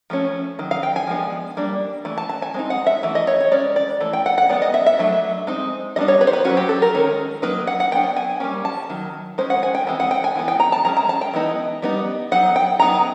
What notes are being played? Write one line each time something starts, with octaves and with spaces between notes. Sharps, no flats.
F3 A3 C#4
D#3 F#3
F5
G5
G#5
F3 G#3 B3 D4
G3 A#3 D4
E3 A3
A5
A5
G#5
G#3 C4 D#4
F#5
E5
E3 A3
D#5
C#5
C#5
G#3 C#4 D5
D5
E3 A3
G5
F#5
F#5
G#3 B3 D#4 D5
D#5
E5
E5
F#3 A3 D4
G#3 C4 D#4
G3 B3 D4 D#5
C#5
B4
C5
B4
F#3 A#3 C#4 F#4
G4
A4
A#4
D#3 G#3 C#4
F#3 A#3 D#4 B4
F#5
F#5
F#3 B3 D4 G5
G#5
G3 A#3 C#4
A5
D#3 F#3
G#3 C#4 C5
F#5
G#5
G5
E3 G#3 C4
F#5
G5
G#5
E3 G#3 B3
G5
A#5
A5
E3 G#3 C#4 A#5
A#5
A5
G5
E3 G#3 B3 D#4
G3 B3 D#4
F#3 B3 D#4 F#5
G5
F#3 B3 D#4 A#5